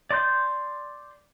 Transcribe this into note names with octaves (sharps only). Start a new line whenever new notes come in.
D5 C6 G6